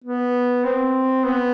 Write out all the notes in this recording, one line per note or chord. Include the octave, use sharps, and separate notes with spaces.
B3
C4
B3